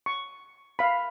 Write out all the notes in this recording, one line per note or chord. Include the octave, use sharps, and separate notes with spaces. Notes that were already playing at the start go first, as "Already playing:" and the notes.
C#6
F5 B5